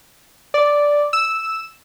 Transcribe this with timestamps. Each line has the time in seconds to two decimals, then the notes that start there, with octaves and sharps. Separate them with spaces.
0.54 D5
1.13 E6